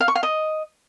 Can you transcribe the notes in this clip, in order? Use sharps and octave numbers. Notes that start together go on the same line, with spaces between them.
F5
C#6
F5
D#5